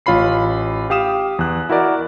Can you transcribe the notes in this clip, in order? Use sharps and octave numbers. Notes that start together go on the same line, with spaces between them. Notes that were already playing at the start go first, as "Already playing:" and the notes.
A1 F4 C#5 B5 C7
G4 F5 D#6 E7
E2 F#6
E4 F#4 A#4 D5 D#5